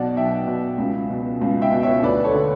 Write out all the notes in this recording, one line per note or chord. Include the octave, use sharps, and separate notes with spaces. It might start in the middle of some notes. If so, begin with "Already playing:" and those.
Already playing: B1 B2 D5 F#5 A5
B1 E5 G5
B2
C#2
B2
C#2
E5 G5
B2
C#5 E5
D2 B4 D5
A4 C#5
D3